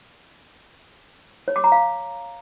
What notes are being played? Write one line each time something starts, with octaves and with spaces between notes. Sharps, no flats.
C#5
D6
A#5
F5